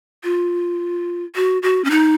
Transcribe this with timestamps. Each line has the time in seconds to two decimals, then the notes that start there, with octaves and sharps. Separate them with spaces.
0.24 F4
1.35 F#4
1.63 F#4
1.85 C#4
1.90 D#4